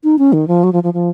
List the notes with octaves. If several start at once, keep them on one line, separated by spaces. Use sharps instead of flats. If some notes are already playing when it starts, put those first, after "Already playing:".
D#4
C#4
D#3
F3
F#3
F3
F3
F3